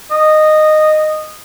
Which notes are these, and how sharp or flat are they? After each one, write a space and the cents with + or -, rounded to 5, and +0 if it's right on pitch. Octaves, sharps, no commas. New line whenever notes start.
D#5 -15